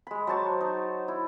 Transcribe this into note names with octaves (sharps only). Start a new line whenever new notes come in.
G#3 B5
F#3 C5 A5 C#6
D#4
E4